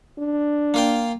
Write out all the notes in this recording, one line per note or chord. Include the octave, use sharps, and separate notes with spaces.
D4
A#3 F4 G5